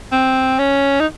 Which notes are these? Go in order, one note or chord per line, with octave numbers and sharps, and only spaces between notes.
C4
C#4
D#4